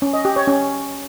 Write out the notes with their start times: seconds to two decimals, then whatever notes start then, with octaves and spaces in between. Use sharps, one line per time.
0.02 C#4
0.13 D#5
0.25 G4
0.36 C#5
0.48 C#4